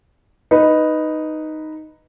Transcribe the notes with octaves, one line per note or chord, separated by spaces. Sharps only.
D#4 B4